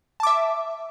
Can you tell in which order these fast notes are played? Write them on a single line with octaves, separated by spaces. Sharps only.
A5 D6 E5